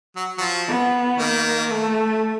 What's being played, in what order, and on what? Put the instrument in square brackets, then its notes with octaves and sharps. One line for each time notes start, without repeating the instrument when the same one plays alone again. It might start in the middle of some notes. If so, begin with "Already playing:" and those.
[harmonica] F#3
F#3
F3
[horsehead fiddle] B3
[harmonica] D#3 [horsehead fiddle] A#3
[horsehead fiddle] A3